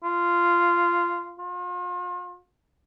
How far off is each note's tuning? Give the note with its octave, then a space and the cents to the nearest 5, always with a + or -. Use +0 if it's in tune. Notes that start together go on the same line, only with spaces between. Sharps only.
F4 -10
F4 +40